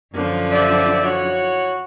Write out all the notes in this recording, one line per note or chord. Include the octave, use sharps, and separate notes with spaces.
F#2 D3 F3
G4 D5 E5
E4 F#4 C#5